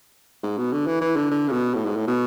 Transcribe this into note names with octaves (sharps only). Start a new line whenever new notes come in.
G#2
B2
D3
E3
E3
D3
D3
C#3
B2
A2
G#2
A2
B2